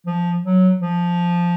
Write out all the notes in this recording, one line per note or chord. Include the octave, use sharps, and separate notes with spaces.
F3
F#3
F3